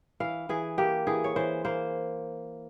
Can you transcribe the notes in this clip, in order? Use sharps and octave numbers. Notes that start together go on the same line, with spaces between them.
E3 F5
E3 G#4
A#3 G4
E3 G#4
C#5
E3 C5
A#3 C5